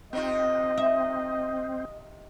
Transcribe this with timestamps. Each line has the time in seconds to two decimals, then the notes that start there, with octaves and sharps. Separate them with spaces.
0.13 C3 C4 D#4 F4 D#5
0.78 E5